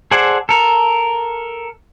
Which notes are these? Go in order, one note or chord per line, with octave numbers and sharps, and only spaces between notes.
G#4 A4 C5 D5 F#5
A4 A#4